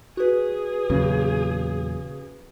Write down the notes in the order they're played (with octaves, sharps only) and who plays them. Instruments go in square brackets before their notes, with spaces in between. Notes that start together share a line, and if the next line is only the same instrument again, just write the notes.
[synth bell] F#4 B4 [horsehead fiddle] G#4
[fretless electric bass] E2 A#2 F#3 [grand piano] C#3